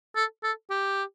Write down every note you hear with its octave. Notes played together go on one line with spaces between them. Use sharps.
A4
A4
G4